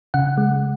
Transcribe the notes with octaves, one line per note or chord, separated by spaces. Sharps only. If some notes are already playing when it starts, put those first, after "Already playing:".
C#3 F#5
G#3